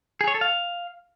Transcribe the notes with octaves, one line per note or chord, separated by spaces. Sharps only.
G#4
C#5
A4
F5